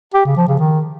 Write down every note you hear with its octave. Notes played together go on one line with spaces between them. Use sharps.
G4
C#3
F3
C#3
D#3